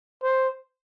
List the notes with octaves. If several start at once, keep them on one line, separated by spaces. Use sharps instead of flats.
C5